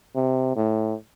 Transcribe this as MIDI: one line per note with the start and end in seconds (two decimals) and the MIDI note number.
0.16 0.55 48
0.56 0.94 45